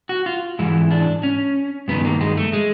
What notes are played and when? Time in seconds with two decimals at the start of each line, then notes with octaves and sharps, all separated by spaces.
0.09 F#4
0.26 F4
0.59 G#2 E3 E4
0.91 D4
1.23 C#4
1.88 G2 D#3 B3
2.05 A#3
2.21 G#3
2.37 A3
2.53 G#3